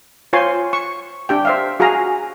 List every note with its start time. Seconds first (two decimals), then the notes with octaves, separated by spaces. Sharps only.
0.33 F4 C5 C#5 G#5 C6
0.73 C#6
1.29 D4 G4 G5
1.45 C5 E5 F5
1.80 F#4 G#4 F5 G#5 A#5